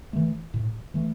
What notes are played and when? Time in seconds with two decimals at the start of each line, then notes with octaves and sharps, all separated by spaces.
0.13 E3 A3
0.54 A2
0.94 E3 A3